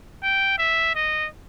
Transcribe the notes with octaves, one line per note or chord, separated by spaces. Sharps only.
G5
E5
D#5